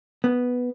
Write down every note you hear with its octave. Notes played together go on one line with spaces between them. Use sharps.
B3